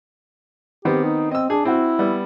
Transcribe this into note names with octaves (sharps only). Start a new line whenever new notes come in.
D#3 B3 C4 G4
D#4
C4 D#5 E6
D4 G#4
C4 E4 F#4
G3 B3